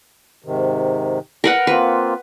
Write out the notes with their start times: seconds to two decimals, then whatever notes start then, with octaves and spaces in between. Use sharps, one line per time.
0.44 G#2 C3 D#3
1.44 A#4 B4 F#5
1.67 A#3 C4 F4 B4